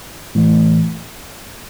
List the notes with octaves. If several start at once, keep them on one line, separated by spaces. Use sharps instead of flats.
A2 E3 A3